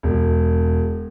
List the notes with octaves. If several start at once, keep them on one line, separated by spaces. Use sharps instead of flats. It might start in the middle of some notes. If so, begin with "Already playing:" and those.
E1